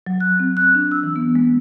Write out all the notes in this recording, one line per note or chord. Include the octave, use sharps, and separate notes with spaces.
F#3
F#6
C4
F#6
D4
E6
E3
B3
G#3